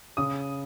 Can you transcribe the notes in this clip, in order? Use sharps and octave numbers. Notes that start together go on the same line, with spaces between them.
C#3 D#6